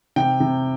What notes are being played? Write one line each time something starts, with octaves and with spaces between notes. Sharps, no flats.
C3 G5
C3